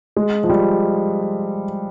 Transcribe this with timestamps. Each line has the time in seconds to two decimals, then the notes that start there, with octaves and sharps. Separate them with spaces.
0.17 G#3
0.44 F3
0.49 G3